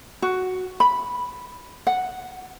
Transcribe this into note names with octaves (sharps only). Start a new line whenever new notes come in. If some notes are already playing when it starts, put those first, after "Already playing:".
F#4
B5
F#5